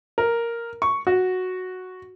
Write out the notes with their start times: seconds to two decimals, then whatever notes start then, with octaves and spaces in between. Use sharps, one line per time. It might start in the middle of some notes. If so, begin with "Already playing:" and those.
0.18 A#4
0.82 C#6
1.07 F#4